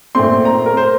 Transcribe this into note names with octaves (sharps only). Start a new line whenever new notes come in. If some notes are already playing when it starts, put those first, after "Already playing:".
A#2 A3 C4 C6
A#5
A#4
C5